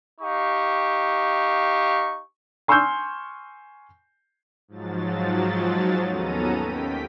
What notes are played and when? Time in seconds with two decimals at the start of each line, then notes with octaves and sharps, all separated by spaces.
0.20 D#4 G4 F5 C#6
2.68 G#5 C6 C#6 E6 F6 G6
4.68 G#2 F3 F#3 A6
6.07 D#2 B3 C#4 A4 A#5 D#7
6.60 D#2 G5 B6